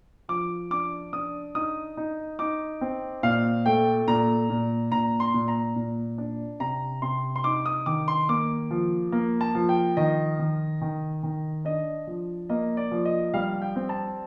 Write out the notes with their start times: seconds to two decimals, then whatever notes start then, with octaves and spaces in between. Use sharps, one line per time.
0.29 F3 D6
0.71 D4 D6
1.13 D4 D#6
1.55 D#4 D#6
1.97 D#4
2.39 D#4 D6
2.81 C4
3.23 A#2 F5
3.66 A3 G5
4.08 A#2 A#5
4.50 A#2
4.92 A#2 A#5
5.20 C6
5.34 A#2
5.48 A#5
5.76 A#2
6.18 D4
6.60 C3 A#5
7.02 C3 C6
7.36 C6
7.44 D#4 D6
7.66 D#6
7.86 D#3 D6
8.08 C6
8.29 A#3 D6
8.71 F3
9.12 A#3
9.41 A5
9.55 F3
9.69 G5
9.97 D#3 D#5
10.39 D#3
10.81 D#3
11.23 D#3
11.65 D4 D#5
12.07 F3
12.49 A#3 D#5
12.77 D5
12.91 F3
13.05 D#5
13.34 G3 F5
13.62 G5
13.76 C4
13.89 A5